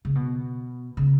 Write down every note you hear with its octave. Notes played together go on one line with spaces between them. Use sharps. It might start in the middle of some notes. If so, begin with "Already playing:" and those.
C#3
B2
C#3